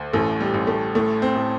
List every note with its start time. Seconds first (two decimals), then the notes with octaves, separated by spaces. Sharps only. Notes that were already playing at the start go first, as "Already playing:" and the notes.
Already playing: D2
0.13 A1 A3
0.40 G3
0.54 A1
0.67 A3
0.95 A2 A3
1.22 C4
1.36 A2